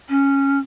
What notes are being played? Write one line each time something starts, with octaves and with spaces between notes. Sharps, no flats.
C#4